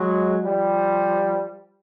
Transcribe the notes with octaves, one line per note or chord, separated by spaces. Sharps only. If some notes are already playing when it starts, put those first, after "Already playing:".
Already playing: F#3 G#3
F3 G3